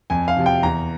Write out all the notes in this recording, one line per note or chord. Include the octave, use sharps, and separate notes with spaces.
F2 G#5
F5
C3 F3
G5
E2 A#5